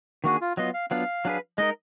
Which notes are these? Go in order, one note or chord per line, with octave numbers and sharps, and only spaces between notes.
D#3 A#3 D4 F#4 G#4
F4
F#3 B3 F4 D#5
F5
F#3 B3 D4 F4 F5
F#3 D4 G#4 B4
G#3 D#4 A#4 D#5